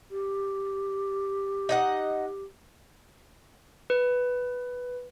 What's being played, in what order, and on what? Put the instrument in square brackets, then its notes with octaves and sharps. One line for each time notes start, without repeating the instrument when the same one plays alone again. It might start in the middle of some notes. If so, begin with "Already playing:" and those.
[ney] G4
[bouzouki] D#4 D#5 F#5
[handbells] B4